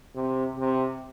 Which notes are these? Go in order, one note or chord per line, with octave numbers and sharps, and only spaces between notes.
C3
C3